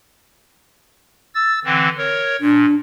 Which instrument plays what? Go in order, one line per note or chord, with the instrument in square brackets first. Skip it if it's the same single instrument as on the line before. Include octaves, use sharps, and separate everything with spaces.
[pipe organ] E6 A6
D3 E3 C4
A#4 C#5
[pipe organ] A#2 [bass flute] D4